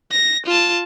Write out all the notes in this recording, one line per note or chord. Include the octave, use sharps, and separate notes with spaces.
A#6
F4 A5